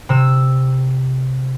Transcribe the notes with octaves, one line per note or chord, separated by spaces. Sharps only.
C3 E6